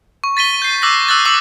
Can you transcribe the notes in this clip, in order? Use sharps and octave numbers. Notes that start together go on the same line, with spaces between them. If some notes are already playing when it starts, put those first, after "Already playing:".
C#6
A6 B6 D#7 G7
G6 C7
D6 E6 F#6 A#6 B6
D#6 E6 F#6 A6
D6 E6 C#7 F#7